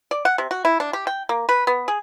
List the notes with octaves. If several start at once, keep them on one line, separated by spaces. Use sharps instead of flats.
D5
F#5
C3
F#4
E4
D4
G4
G5
A#3
B4
B3
G#4